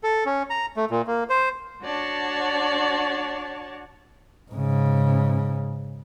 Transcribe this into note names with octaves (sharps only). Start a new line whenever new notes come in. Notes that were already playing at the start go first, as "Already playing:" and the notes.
A4
C#4
A#5
A3
A#2
A#3
C5
D4 F#4 C#5 D5 A5
G#2 C#3